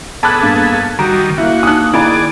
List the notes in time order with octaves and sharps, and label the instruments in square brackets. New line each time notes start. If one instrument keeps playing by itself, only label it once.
[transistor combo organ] B3 G#4 A4 [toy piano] A5 [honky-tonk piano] B5 D6 F#6
[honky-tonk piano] G2 [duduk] A#3
[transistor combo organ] D#3 G3 [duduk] F#4 [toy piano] A#5 [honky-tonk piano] D7
[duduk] A#3 [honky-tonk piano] E4 [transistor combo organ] F#4
[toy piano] D4 D#4 [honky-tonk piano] D#6 F#6
[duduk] D#3 [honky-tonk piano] A#3 [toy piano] E4 G#5 B5 [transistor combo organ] G#4 D5